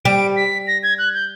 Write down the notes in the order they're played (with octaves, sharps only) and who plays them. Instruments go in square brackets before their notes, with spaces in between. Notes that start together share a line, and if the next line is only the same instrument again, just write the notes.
[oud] G3 [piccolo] D7
[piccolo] B6
A#6
G#6
F#6
G6